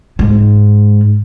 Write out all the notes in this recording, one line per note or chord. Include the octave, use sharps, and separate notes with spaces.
G#2